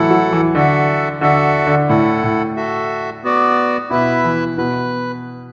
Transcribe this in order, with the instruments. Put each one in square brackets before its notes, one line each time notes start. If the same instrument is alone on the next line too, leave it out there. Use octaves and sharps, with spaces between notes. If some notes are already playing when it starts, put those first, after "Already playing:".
Already playing: [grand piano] A2 E3 F#3 [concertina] E4 A4 F#5
[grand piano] F#3
E3
[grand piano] D3 [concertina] F#4 A4 E5
[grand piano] D3 [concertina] F#4 A4 E5
[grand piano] D3
[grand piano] A2 [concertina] E4 A4 F#5
[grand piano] A2
[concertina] F#4 A4 E5
B3 F#4 D5
[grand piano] B2 [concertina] E4 B4 E5
[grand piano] E3
[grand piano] B2 [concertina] B4